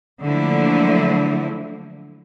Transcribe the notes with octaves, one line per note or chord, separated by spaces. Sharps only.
D3 F3 F#3 A3 A#3 E4